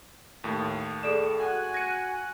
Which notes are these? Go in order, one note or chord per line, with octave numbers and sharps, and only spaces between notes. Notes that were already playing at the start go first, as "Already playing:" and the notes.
D#2 A2
G#4 A4 D5 E7
F#4 G#5 F#6
G#6 A#6 C#7 D#7